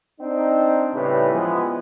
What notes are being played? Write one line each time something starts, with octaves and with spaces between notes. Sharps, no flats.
C4 D4 D#4
A2 C#3 G3 E4 B4
E3 F3 G#3 B3